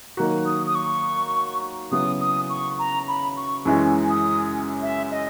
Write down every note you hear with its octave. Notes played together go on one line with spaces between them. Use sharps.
D#3 F#3 A#3 D#4 F#4
D#6
D#6
C#6
C#3 F#3 B3 E4 D#6
D#6
C#6
A#5
B5
C#6
F#2 E3 G#3 C#4
D#6
E5
D#5